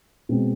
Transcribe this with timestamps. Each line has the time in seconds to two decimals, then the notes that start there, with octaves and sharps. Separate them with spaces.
0.29 B2 G#3 C4